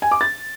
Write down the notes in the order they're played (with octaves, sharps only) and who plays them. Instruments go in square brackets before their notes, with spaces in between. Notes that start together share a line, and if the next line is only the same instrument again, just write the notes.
[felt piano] G#5
D6
A6